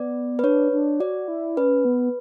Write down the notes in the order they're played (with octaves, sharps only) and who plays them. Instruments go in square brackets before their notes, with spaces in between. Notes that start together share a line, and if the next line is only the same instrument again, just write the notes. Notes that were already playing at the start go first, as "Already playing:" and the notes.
Already playing: [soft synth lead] B3 [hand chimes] D5
[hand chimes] B4
[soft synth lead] D4 [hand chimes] C#5
[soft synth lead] D4
[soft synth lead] F#4 [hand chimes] D5
[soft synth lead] E4
[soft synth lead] C#4 [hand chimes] B4
[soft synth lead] B3